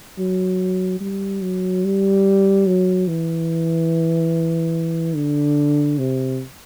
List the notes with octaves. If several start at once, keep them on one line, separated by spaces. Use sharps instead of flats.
F#3
G3
F#3
G3
F#3
E3
D3
C3